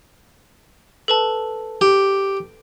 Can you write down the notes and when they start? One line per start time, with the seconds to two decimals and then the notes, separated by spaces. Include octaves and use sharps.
1.08 A4 B4 A5
1.81 G4